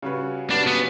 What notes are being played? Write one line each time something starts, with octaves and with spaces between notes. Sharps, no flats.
C#3 G3 C#4 F#4 B4
C#3 G3 C#4 D4 F#4 B4
B3